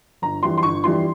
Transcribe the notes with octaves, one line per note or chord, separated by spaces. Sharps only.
G1 A#5
F2 E3 G3 C6
C6
G1 C#6
F2 E3 G3 C6